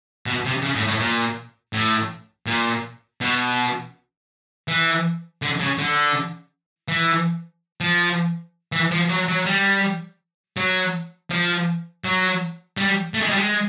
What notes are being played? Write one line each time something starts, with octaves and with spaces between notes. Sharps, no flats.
B2
C3
C#3
A2
A2
A#2
A2
A#2
B2
E3
D3
C#3
D3
E3
F3
E3
F3
F#3
F#3
G3
F#3
F3
F#3
G3
A3
G#3
G3
G#3